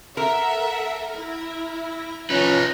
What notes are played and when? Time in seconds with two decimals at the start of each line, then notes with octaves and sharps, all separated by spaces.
0.17 A4 A#4 E5 F#5
1.15 E4
2.30 F3 C#4 D#4 B4